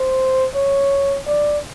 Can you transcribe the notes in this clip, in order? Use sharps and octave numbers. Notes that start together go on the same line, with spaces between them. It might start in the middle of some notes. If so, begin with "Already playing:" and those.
Already playing: C5
C#5
D5